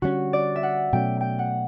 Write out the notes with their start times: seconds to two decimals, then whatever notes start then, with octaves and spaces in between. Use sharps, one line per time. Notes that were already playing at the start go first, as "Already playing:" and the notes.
0.02 D3 G3 C#4 F#4
0.33 D5
0.56 E5
0.63 F#5
0.93 B2 F#3 A3 C#4 G5
1.21 G5
1.39 F#5